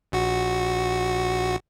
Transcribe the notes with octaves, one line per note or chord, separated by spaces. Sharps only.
A#1 F#4